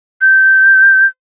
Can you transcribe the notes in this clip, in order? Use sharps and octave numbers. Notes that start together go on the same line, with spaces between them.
G6